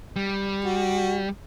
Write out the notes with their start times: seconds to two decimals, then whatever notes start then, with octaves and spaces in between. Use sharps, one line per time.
0.16 G3
0.65 F#4